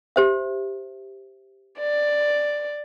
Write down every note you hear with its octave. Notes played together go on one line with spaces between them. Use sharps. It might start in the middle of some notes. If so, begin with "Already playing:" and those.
G4 C5 E5
D5